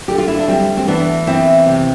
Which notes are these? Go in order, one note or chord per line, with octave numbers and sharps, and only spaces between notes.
D3 G4
F4
E4
D4
G3 C4
C4
E3 B3 D4
B3 C4 E4
C3